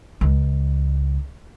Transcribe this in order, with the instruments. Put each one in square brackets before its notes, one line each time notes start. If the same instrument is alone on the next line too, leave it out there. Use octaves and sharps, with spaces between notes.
[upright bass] C#2